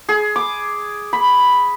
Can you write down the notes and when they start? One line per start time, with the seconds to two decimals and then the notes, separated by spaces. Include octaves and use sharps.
0.09 G#4
0.36 D6
1.13 B5